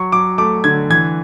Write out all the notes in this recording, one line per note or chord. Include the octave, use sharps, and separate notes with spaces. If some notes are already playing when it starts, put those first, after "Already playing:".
Already playing: F#3 C#6
F#3 D6
A3 D6
D3 G#6
E3 G#6